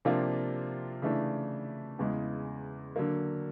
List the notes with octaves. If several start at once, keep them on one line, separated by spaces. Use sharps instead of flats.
C3 F3 A#3 D4 F4
C#3 E3 A3 D4
E2 C#3 E3 G#3
D3 F#3 A#3